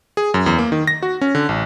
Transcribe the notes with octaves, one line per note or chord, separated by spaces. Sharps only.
G#4
F#2
E2
A#3
D#3
A#6
F#4
C#4
D3
A1